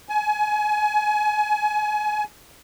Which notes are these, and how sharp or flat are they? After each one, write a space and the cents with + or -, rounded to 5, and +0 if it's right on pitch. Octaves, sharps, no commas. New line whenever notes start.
G#5 +30